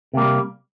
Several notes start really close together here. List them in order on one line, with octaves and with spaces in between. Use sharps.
C3 A#3 G3